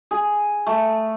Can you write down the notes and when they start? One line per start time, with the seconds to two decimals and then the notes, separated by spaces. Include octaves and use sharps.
0.11 G#4
0.67 A3